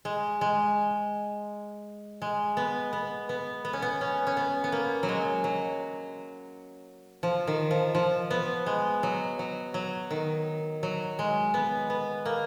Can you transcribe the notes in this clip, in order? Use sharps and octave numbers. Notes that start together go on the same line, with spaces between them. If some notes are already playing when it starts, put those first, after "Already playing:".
G#3
G#3
G#3
B3
B3
B3
B3
C#4
B3
C#4
C#4
B3
B3
A#3
F#3
G#3
F#3
F3
D#3
F3
F3
B3
G#3
F#3
F#3
F#3
D#3
F#3
G#3
B3
B3
A#3